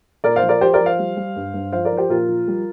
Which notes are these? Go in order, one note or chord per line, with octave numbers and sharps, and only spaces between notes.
A#2 A#4 D5
C5 F5
F3
A#4 D5
F3 G4 C5
A#4 D5
F3
C5 F5
G3
G3
G2
G2
F3 C5 F5
A#4 D5
F3
G4 C5
A#2 F4 A#4
F3
G3